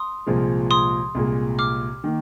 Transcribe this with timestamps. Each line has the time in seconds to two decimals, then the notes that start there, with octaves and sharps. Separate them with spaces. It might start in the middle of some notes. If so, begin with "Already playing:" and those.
Already playing: C6 D#6
0.27 C2 A#2 F3 G#3
0.71 C6 D#6
1.15 C2 A#2 G#3
1.59 D6 F6
2.04 D#3 A#3